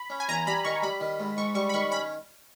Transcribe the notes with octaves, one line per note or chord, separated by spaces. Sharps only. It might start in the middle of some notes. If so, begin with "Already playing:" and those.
Already playing: B5
C#4
G#5
E2 A#5
G3 B5
D#3 C#6
G3 B5
D#3
G#2
G#2 C#6
G3 C#6
B5
D#3 C#6
C#4 B5